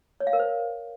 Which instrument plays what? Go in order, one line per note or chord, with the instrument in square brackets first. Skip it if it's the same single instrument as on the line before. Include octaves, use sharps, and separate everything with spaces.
[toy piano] C#5
F5
A#4
C5